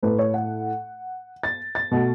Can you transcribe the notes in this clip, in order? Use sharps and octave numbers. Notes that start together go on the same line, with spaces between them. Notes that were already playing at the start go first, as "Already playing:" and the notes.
A2 A3 B4
C#5
F#5
A6
A6
B2 A3